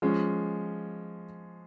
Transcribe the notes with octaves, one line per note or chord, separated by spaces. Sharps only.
F3 G#3 C#4